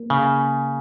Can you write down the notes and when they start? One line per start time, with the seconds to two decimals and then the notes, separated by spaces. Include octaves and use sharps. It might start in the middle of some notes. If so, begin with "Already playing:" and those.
Already playing: A#3
0.10 C#3